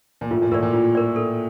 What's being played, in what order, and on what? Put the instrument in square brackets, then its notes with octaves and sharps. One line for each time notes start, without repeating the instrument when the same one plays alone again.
[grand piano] A#2
[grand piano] A2 [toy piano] F4
[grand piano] A#2
[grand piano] A2 [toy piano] A#4 D5
[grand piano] A#2
[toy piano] F4
A#4 D5
A4